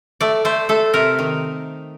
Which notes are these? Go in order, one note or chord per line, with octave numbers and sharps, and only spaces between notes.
A3 D5
A3 C5
A3 A4
C3 A#4
D#3